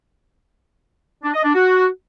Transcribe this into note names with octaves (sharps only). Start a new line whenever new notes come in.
D4
D#5
D4
F#4